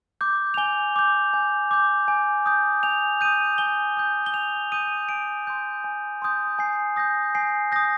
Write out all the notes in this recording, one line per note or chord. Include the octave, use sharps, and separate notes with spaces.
D6 G6
F7
G#5 G7
D6 G6
G#5
D6 G6
G#5
D#6 G6
G#5 F7
D#6 G6 D#7
G#5 G7
D#6 G6
G7
G#5 F7
D#6 G6 D#7
G#5 D7
C6 D#6 G6
G#5
C6 D#6 G6
G#5 C7
D#6 G6 A#6
G#5 C7
D#6 G6 A#6